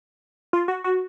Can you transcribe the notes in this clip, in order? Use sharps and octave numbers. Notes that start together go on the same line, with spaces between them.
F4
F#4
F#4